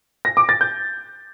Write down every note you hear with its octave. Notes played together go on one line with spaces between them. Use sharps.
A#6
D6
A6
G6